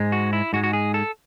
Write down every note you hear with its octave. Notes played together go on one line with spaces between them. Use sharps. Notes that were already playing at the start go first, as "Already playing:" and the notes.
Already playing: G#2 G#3
F#4
E4
G#2 G#3 F#4
F#4
G#4
A4